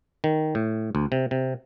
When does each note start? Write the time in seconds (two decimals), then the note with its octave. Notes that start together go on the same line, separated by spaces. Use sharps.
0.24 D#3
0.55 A2
0.95 D2
1.12 C3
1.31 C3